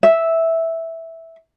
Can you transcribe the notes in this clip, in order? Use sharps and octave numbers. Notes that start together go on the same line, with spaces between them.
E5